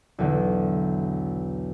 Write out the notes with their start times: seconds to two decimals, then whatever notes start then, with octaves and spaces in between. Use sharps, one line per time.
0.19 B1 E2 D3